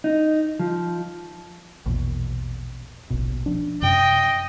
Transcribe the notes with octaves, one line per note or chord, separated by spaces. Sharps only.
D#4
F3
A#1 E2 B2
D1 A#1 B2
F3 D4
F#2 C3 D#5 G5